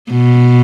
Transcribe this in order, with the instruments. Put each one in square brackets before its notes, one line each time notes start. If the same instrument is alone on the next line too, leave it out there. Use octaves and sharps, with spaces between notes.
[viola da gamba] B2